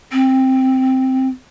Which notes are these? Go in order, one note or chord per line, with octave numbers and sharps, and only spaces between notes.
C4